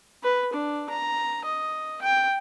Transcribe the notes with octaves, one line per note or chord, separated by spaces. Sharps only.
B4
D4
A#5
D#5
G5